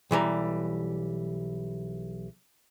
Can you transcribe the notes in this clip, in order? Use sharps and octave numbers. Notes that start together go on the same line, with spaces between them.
B1 E3 G3 A#5